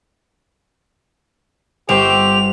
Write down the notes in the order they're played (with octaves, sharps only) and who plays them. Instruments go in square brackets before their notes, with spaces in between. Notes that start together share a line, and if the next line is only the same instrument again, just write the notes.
[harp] G1 C5 C#5 [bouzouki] C4 [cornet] G4 [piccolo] F7